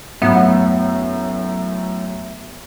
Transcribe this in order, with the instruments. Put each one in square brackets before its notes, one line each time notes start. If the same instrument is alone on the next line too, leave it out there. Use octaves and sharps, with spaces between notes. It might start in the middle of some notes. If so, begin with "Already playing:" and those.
[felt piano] F#2 A2 [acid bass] B3 [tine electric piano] E5